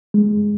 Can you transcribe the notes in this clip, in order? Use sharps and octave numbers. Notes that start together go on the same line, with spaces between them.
G#3